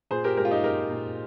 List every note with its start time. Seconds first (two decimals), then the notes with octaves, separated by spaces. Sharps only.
0.11 A#2 G#4 C5
0.24 G4 A#4
0.37 G#3 G4 A#4
0.45 F4
0.51 D#4 G4
0.63 G#3 G4 A#4
0.91 A#2